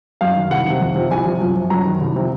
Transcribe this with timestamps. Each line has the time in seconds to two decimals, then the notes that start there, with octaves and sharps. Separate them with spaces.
0.21 F#2 F5
0.36 D#3
0.51 C2 F#5
0.66 C3 D#3
0.81 F2
0.96 C3 F3
1.11 C2 G#5
1.26 C3 F3
1.41 F#2
1.56 F3
1.70 F#2 A#5
1.86 D#3
2.01 C2
2.16 C3 F3